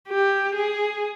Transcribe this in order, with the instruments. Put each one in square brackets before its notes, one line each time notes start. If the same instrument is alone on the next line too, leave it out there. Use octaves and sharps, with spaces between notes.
[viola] G4
G#4